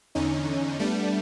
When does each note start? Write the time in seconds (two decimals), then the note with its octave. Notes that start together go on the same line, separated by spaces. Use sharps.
0.15 E2 D3 C#4 D#4
0.79 G3 A3 B3 D4